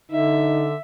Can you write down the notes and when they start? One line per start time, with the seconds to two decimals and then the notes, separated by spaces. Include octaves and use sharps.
0.12 D3 D#4 E5